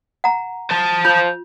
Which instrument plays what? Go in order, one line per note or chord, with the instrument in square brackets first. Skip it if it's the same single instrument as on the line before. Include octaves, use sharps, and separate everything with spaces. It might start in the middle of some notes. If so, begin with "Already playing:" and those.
[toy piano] F#5 A#5
[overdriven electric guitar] C5 A5
[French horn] F3 [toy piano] F4 [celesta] G6 F7